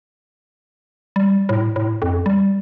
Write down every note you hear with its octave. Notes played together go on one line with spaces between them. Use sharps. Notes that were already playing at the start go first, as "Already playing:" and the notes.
G3
A2
A2
F2
G3